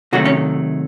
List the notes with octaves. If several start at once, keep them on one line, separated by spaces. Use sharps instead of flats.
C3 D#3 F#3 A3 F#4
C#4